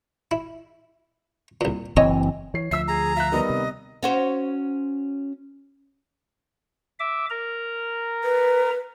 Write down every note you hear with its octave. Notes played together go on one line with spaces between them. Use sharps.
E4
C2 A#2
F#1 E3 C4 C#5 D#5 G#5
E3 C#5 C7
D2 F3 E5 E6 C7
G#4 A#5
F4 E5 F#6
D#3 G3 B3 D#5
C3
C#4 F#4 C5
E5 D6
A#4 A#5
B4